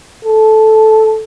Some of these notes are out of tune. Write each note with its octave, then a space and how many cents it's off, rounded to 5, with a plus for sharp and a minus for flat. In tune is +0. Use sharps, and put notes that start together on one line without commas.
A4 -10